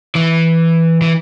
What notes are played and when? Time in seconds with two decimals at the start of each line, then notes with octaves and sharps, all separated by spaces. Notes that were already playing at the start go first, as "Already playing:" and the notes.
0.15 E3
1.01 E3